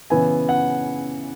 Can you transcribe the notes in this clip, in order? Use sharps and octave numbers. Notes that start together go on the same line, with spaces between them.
C#3 E3 B3 G#5
F#5